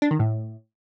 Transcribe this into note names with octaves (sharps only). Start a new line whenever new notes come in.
D4
D#3
A2